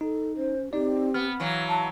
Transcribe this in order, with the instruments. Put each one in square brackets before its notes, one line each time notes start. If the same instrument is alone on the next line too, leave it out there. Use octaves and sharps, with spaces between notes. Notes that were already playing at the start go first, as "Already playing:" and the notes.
[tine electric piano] D#4 [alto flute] A4
[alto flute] C#4 [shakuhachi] C5
[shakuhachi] C4 [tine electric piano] D#4 D5 [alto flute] G4
[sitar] B3 [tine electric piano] F6
[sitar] E3 F#3 [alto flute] F5
[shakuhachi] A5